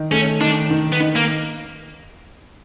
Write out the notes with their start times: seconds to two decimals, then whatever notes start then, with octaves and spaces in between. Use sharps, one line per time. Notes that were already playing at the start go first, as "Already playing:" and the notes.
Already playing: D#3
0.11 A3 C#4
0.41 D#3 D4
0.71 D#3
0.92 B3
1.00 D#3
1.16 A#3